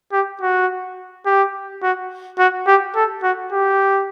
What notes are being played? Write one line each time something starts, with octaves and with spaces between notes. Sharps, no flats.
G4
F#4
G4
F#4
F#4
G4
A4
F#4
G4